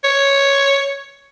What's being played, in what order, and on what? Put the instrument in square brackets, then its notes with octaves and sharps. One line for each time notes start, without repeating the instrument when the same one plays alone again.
[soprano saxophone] C#5